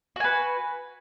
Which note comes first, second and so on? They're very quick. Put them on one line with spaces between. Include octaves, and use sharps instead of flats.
F#4 G#5 B4